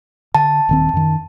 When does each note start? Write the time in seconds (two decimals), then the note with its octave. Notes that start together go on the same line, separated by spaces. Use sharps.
0.35 D3 A5
0.69 D#1 D#3 C4
0.93 F#2 D#3